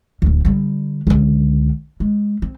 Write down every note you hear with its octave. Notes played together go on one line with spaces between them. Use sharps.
D1 D2
D3 G3
C#2 D3
G#3
C4